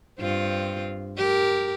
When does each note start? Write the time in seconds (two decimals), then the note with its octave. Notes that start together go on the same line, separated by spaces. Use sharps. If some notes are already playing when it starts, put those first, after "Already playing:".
0.20 G2 C4 F4
1.18 G4 A#4